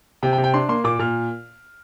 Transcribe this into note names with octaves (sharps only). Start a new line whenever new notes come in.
C3 G5
G5
C3
G5
D4 C6
A#3 C6
A#2 D6
A#2 F6